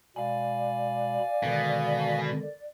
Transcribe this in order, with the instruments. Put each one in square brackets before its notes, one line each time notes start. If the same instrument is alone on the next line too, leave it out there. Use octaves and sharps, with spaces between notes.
[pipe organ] B2 G#3 B5 [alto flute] D5 [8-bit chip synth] F5 G#5
[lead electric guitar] B2 [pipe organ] D3 D#3 G#3